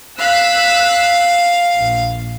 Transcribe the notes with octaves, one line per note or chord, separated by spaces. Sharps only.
F5 E6 F#6 B6
A#1